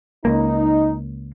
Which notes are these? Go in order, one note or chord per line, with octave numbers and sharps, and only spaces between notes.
C#2 A#3 D#4